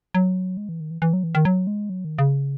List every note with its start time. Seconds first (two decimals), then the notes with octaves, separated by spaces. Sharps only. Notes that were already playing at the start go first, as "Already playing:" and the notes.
0.14 F#3
0.57 G#3
0.69 E3
0.80 D#3
0.91 E3
1.02 E3
1.13 F#3
1.24 E3
1.35 D#3
1.45 F#3
1.67 G#3
1.90 F#3
2.05 D#3
2.18 C#3